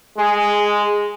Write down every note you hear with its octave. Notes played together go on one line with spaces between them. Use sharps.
G#3 G#4